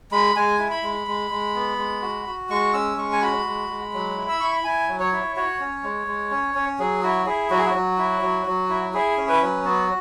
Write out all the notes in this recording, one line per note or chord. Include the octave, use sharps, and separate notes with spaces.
G#3 B5
G#3 G#5
E4
B5
G#3
G#3
G#3
B3
G#3
F#4
F#4
G#3 C#6
C#4 E6
G#3 C#6
G#5
F#4 B5
G#3
G#3
F#3
E4
E6
E4 C#6
B5
E4 G#5
F#3
C#5
E4
F#4 C#5
C#4
G#3
G#3
C#4
C#4
F#3 G#4
E4 F#4
E4 G#4
F#3 F#4
G#4
F#4
F#3
E4
F#3
F#3
E4
E4 G#4
C#4
B4
F#3
B3 F#4